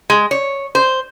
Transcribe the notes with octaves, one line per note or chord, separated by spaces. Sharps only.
G#3
C#5
C5